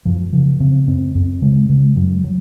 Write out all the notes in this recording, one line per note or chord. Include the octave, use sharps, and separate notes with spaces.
F#2 F3
C#3 F3
C#3 C4
F#2 C4
F#2 C4
C#3 G#3
C#3 G#3
F#2 F#3
F#3